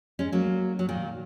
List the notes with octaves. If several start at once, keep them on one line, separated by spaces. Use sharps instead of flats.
G#3 C#4
F#3 A#3
F#3
A#2 D#3